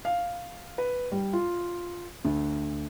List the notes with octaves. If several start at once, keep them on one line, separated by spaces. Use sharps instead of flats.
F5
B4
G3
F4
D2